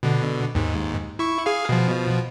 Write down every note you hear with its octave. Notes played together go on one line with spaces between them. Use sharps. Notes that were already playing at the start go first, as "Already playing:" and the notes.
B2 D3
D#2 G#2
E4 C#6
G#4 F5
B2 F3